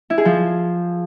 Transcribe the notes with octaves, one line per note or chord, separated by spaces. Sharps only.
E4
G#4
F3